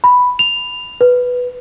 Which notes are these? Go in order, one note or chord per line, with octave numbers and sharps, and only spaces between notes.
B5
F7
B4